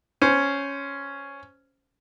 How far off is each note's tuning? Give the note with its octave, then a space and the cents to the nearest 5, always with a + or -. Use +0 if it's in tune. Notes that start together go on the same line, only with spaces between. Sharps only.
C#4 +0 C5 -5